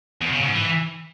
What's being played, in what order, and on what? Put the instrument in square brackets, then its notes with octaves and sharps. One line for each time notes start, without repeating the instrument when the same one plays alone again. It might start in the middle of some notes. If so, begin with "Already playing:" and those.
[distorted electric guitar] E2
C#3
G#2
E3